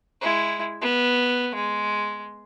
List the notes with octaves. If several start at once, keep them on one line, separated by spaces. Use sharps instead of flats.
G#3 E4
B3
G#3